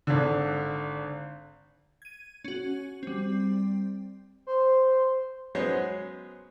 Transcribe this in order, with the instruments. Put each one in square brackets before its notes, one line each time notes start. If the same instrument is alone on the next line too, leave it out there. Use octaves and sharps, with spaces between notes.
[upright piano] G#1 D3
[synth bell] G#6 D#7
C#4 F#4
G3 C4
[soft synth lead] C5
[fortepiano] F#3 G#3 B3 C#4 C5 C#5